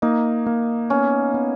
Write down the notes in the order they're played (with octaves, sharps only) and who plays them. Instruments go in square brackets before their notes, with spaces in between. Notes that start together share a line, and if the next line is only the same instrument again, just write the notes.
[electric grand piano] A#3 [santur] D#4
[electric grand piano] A#3
[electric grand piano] B3 [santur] C#4
[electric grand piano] B3